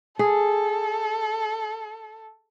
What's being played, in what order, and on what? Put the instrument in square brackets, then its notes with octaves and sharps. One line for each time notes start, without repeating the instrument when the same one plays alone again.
[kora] G#4 [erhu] A4